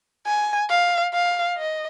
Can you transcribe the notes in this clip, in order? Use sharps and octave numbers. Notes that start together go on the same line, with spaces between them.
G#5
F5
F5
D#5